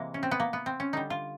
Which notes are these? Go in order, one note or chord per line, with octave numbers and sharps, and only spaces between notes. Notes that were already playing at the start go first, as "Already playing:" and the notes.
Already playing: C3 E3 G#3 A#3
C#4
C4
B3
A#3
B3
C4
C#4
D3 G3 D#4
F4